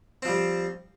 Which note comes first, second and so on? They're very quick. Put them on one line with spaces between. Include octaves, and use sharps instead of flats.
C4 F3 G3